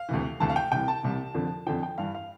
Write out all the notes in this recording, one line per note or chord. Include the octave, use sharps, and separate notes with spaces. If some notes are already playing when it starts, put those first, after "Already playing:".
Already playing: F5
D2 C3 E3
D2 C3 E3 A5
F5
G5
C2 C3 E3 G5
A5
C2 C3 E3
F2 D3 F3
F2 D3 F3 G5
G5
G2 E3 F5
F5